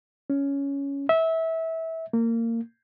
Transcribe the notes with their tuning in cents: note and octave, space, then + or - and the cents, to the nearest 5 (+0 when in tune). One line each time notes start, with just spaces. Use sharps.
C#4 +10
E5 -20
A#3 -25